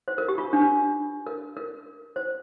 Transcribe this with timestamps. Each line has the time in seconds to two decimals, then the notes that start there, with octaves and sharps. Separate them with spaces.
0.08 C5
0.18 A#4
0.28 G4
0.38 F4
0.53 D4
1.26 A#4
1.57 A#4
2.16 C5